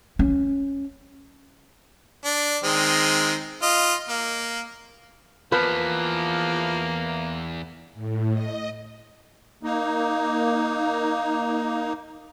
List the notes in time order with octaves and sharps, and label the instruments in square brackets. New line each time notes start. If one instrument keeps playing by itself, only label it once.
[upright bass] C#4
[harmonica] D4
D#3 G#3 C4
F4 D#5
A#3
[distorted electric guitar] E2 E3 [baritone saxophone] F3 [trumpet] A#3 [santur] B4
[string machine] A2
D#5
[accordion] A#3 D#4